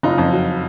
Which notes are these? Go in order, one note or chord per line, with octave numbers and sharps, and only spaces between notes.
F#1 D#4 F4
F2
F#3